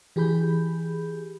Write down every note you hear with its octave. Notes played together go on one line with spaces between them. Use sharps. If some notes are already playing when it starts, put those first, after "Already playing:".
E3 G4 G#4 B5 G6